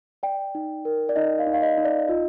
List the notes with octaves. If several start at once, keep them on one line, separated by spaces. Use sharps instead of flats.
D5 G5
D#4
A#4
D5
D#4 D#5
F5
D#4
F5
D#5
D#4
D5
D5
F4 D#5